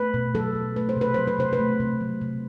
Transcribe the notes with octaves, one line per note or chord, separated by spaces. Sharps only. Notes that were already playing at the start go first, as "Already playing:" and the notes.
Already playing: A3 B4
B2
F#3 A4
B2
A3 B4
C5
C3 B4
F#3 C5
B4
C3 C5
B4
A3
C3
F#3
C3